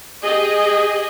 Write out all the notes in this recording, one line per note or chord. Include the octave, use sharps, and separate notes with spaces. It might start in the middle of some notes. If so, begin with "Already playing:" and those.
G4 G#4 D#5